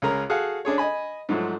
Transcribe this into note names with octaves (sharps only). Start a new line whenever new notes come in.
C#2 C#4 G#4 A#4 A#5
F#4 G#4 A4 F5 F#5
C#4 D4 G#4 C#5
D#5 G#5 B5
G#2 F3 F#3 A3